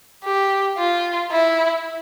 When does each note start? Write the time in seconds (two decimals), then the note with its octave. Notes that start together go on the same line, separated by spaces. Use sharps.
0.25 G4
0.78 F4
1.31 E4